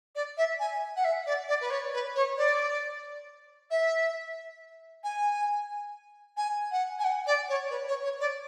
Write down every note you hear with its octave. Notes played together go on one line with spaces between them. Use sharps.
D5
E5
G#5
F#5
E5
D5
D5
B4
C#5
B4
C#5
D5
E5
G#5
G#5
F#5
G#5
F#5
D5
C#5
B4
C#5
C#5
D5